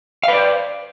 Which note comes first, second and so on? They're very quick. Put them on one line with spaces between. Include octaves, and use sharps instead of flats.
F5 B4 D5 C5